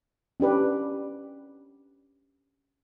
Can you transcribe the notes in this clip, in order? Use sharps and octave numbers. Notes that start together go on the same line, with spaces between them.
C#4 D4 G4 B4